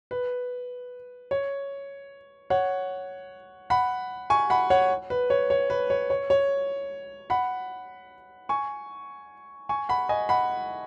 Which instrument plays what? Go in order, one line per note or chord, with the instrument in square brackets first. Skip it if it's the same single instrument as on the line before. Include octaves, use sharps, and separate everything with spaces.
[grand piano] B4
C#5
C#5 F#5
F#5 B5
G#5 C#6
F#5 B5
C#5 F#5
B4
C#5
C#5
B4
C#5
C#5
C#5
F#5 B5
G#5 C#6
G#5 C#6
F#5 B5
D#5 G#5
F#5 B5